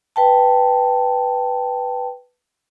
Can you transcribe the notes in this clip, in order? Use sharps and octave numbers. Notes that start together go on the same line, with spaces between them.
B4 G5 A5